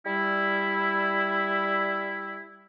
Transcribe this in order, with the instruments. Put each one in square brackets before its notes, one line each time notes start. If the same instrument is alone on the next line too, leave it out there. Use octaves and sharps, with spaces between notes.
[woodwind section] G3 E4